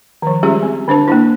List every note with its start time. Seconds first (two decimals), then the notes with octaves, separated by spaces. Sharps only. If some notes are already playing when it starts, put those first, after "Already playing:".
0.22 D#3 F3
0.43 G3 G#3 C#4 F4 G4 G#4
0.63 C4
0.88 D3 D4 C5 A5
1.08 A#3 D4 E4